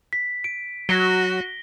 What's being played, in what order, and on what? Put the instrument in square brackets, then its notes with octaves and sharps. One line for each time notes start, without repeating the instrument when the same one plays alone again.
[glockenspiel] B6
D7
[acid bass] F#3 [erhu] F#4 [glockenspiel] A#6 G7